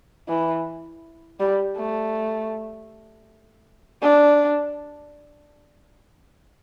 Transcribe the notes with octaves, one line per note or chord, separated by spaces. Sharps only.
E3
G3
A3
D4